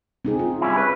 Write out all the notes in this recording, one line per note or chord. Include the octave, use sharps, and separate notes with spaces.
C4 D#4 G#4
F4
G3 C#4 E4
B4